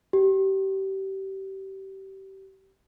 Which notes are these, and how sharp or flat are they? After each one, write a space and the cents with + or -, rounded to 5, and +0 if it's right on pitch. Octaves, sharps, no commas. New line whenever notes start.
G4 -25